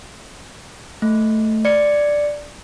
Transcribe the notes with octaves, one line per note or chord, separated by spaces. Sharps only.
A3
D5 C#7